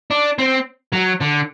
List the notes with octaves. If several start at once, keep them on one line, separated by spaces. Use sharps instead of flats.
D4
C4
F#3
D3